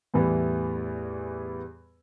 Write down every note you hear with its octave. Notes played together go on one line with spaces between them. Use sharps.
E2 A2 E3 G3 B3